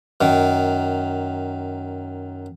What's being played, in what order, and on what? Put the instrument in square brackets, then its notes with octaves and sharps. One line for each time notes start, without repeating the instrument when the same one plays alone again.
[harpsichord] F#2 D#3